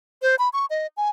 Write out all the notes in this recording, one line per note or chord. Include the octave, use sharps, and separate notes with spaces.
C5
B5
C#6
D#5
G#5